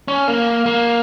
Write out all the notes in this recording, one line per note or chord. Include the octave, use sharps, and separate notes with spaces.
C#4
A#3
A#3